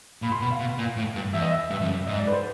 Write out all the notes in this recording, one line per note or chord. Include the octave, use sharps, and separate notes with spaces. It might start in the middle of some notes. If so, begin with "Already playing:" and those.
A#2 B5
C6
B2 B5
F5
B2
A#2
A2
G2
E2 E5
D#5
E5
G2 E5
F2
F#2
G#2 D#5
D5
B4
C5